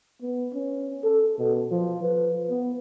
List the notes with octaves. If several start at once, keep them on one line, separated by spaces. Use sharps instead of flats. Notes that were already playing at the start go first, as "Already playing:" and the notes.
B3
C#4
A4
B2
F3
B4
B3